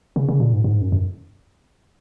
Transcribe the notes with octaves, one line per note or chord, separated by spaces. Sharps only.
C#3
C#3
A#2
G#2
G#2
F#2
F#2